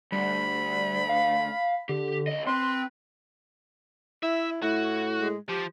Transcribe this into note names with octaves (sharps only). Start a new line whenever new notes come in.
D2 G3 B5
F5
D3 G4
C#2 D#5
C4 B4 C6
E4 E5
A2 E4 F#4
G#3
F3 G4